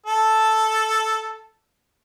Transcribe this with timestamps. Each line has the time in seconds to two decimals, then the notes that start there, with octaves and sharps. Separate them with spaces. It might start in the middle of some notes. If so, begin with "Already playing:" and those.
0.06 A4 A5